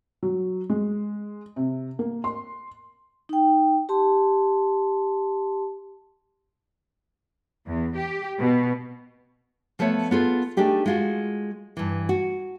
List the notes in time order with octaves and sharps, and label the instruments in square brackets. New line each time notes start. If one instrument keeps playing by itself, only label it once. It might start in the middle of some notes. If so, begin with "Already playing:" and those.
[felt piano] F#3
G#3
C3
A#3
C6
[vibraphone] D#4 G5
G4 A5 C6
[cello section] E2
G4
B2
[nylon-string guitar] F3 A3 B3 C#5 E5
B3 F4 G#4 A4
A3 D4 D#4 G4 G#4
G#3 F4 F#4
G2 E3
F#4